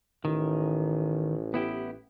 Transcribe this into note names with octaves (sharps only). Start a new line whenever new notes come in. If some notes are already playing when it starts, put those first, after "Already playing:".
A1 D#3
B3 E4 G4